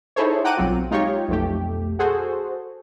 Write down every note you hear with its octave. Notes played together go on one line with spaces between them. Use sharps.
D#4 E4 G#4 A4 C5 C#5
F#5 G5 A#5 D6 F#6 D#7
B1 F#3 C4 F4
G#3 D#4 F4 G4 C#5
B1 F2 A3 G4
F#4 G#4 A4 C5